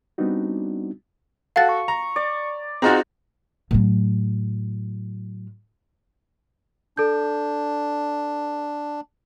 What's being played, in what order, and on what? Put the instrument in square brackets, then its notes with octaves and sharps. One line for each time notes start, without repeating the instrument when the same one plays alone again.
[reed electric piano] G3 B3 C4 D4 D#4 F#4
[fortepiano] F#4 A4 [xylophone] F5 A6 [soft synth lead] F#5
[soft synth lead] C#6
[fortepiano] A#5
[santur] D5
[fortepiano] C4 D#4 F#4 [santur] F4 F#5 A#5 [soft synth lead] G#4
[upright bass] A2 F#3
[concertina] D4 [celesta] A4 G6